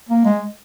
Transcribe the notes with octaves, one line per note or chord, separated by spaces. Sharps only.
A#3
G#3